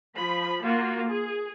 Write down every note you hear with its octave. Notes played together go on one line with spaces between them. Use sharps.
F3 B5
A#3 F4 F#4
G#4